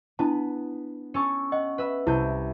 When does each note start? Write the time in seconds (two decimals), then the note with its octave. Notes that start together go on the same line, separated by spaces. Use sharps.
0.19 B3 D4 E4 A5
1.14 C#4 A4 C#6
1.52 D#5 F#5
1.78 B4 E5 B5
2.07 C2 E4 A5 G6